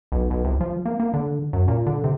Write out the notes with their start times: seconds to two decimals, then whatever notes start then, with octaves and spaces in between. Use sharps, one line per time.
0.12 B1
0.30 B1
0.44 C2
0.61 F3
0.86 A#3
1.00 A#3
1.14 D3
1.53 F#2
1.68 A#2
1.87 D3
2.04 C3